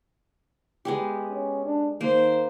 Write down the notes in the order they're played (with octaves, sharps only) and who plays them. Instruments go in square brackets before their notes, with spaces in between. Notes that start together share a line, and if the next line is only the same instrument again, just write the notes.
[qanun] G#3 B3 G4
[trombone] C#4
D4
[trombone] D#3 [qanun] A#3 [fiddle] C5